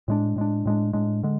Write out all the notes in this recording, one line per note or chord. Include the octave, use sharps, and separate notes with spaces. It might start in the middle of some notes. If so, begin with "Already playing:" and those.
A2 G#3 D4
A2 G#3 D4
A2 G#3 D4
A2 G#3 D4
D3 G#3